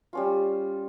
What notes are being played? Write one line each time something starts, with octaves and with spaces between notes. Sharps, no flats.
G3 C#4 F4